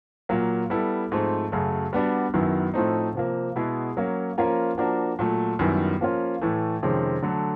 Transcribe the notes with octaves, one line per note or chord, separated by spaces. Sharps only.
A#2 F#3 A#3
G3 B3 E4 A4
G#2 F3 A3 C4
F#2 C#3 F#3 A3
G3 B3 D4 F#4
F#2 D#3 F#3 B3 E4
A2 F3 A3 C4 D#4
C3 F3 A#3
B2 G#3 B3 E4 G#4
F#3 A#3 C#4
F3 A#3 C#4 F4 A#4
F3 A#3 D4 F#4 A#4
A#2 F#3 A3
F#2 D#3 G3 B3 E4
F3 A#3 C#4 F4
A2 E3 A3
F2 C3 D#3 G#3 C#4
D3 F#3 A3